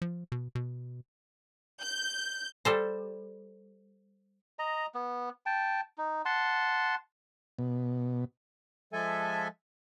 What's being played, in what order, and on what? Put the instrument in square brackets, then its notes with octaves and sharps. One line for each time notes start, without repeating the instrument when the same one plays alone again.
[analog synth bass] F3
B2
B2
[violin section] G6
[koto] G3 A4 C5
[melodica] D#5 A#5
B3
G5 A5
D#4
F#5 A5 C6
[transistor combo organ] B2
[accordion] F3 G#3 A4 E5 G#5